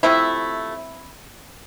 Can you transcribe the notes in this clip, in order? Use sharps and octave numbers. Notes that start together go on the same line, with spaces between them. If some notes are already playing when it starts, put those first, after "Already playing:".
C3 F3 A3 C4 E4